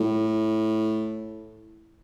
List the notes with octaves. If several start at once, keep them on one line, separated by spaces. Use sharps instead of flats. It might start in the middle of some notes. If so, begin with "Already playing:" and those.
Already playing: A2